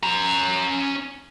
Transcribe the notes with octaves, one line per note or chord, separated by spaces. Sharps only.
C#4 A#5